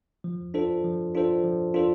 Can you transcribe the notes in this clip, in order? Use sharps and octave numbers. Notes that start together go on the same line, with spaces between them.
F3
D4 F4 A4 C5
F3
D4 F4 A4 C5
F3
D4 F4 A4 C5